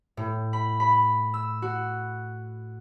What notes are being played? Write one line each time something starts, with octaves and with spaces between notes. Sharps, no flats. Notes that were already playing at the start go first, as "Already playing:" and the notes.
A2
B5
B5
E6
F#4